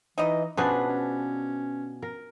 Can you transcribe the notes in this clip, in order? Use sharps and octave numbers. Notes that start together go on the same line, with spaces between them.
E3 D#4 E4 D#5
B2 F3 C#4 D4 G#4 B4
C#4
A#4